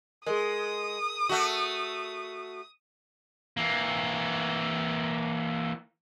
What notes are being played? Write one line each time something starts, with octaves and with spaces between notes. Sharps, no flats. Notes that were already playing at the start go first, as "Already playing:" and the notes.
G#3 G#4 A#4 D#6
A3 F#4
E3 A#3